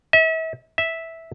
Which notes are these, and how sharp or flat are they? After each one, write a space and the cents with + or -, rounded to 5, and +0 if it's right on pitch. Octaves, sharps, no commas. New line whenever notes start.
E5 -40
E5 -10